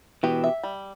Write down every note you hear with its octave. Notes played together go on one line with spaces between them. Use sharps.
B2 E3 G4
E5
G3